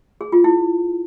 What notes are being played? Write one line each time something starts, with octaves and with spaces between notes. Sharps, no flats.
G#4
F4
E4